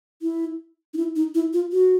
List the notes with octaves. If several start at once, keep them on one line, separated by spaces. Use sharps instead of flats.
E4
D#4
E4
D#4
E4
F4
F#4